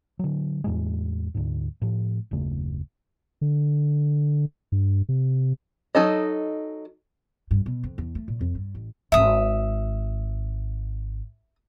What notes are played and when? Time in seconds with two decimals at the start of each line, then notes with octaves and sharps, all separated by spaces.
0.19 D3 F#3
0.64 E2 A2 G#3
1.34 D2 G#2
1.82 A2 F3
2.31 F#1 D#2 C#3 A3
3.41 D3
4.72 G2
5.09 C3
5.95 F#3 D#4 A4 D#5
7.51 G2
7.66 B2
7.84 F2
7.98 E2
8.15 A3
8.28 A#2
8.41 F2
8.55 G2
8.75 A1
9.12 D1 G#1 E5 D#6